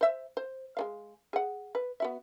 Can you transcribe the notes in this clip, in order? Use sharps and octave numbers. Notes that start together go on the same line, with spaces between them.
C5 E5
C5
G#3 B3 F5
G#4 F#5
B4
B3 F#4 E5